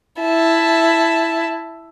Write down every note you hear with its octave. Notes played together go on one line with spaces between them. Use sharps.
E4 A5